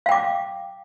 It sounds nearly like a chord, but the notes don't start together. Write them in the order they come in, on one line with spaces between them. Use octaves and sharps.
F5 G5 D6